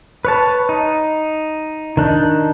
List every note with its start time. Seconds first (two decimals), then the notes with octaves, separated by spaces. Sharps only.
0.25 B4 C#5 A5
0.69 D#4
1.97 D#3 D4 D#4